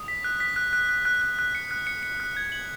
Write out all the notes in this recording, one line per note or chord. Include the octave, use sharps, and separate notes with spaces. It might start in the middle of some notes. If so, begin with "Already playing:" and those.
Already playing: D#6
B6
F#6
B6
F#6
F#6
F#6
F#6
F#6
F#6
C#7
F#6
C#7
C#7
F#6
G#6
F#7